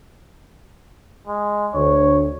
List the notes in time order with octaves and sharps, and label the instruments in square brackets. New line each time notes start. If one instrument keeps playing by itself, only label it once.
[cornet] G#3
[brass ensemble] D2 [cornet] C#5